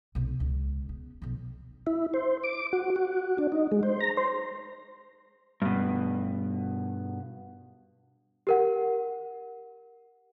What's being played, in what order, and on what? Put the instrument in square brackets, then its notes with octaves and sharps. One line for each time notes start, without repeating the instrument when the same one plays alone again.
[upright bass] B1 C3
C#2
B3
B1 F3
[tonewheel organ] E4
C5
D6
F#4
F#4
D4
D#4
G#3
C5
A#5
C5
[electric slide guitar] G2 B2
[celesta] G4 A#4 F#5